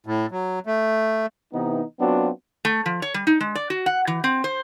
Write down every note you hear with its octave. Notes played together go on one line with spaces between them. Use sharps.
A2
F#3
A3
C3 E3 B3 D#4
F#3 B3 C4 D4 F4 F#4
A3
F3
C#5
G3
D#4
G#3
D5
F#4
F#5
E3
C4
C5